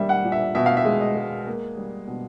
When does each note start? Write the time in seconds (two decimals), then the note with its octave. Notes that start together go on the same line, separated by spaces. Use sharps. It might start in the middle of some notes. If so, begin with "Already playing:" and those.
Already playing: G3 A#3 E5
0.09 F#5
0.24 A#2
0.32 E5
0.55 B2 E5
0.66 F5
0.77 E5
0.85 G#3
1.01 D#5
1.16 G#3
1.47 A#3
1.77 G3
2.07 B2